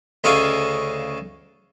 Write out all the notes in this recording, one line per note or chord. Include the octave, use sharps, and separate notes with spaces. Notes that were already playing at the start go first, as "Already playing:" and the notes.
D2 C#3 A4 D#5 F5 C#6